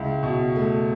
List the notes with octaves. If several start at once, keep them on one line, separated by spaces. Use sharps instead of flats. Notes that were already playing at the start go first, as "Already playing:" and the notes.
Already playing: C#2 E4
B2
A3